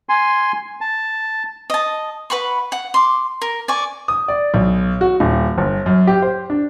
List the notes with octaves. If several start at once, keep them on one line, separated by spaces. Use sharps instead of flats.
G#5 C6
A5
D#5 A5
B4 F#5 B5 C#6
F#5
C6 D6
A#4
D5 G#5 C#6
D#6
D5
B1
F#4
D#1
G1
F#2
G4
C5
D4